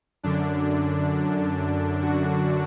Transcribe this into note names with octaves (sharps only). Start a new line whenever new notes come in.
F#2 D3 D4
F#4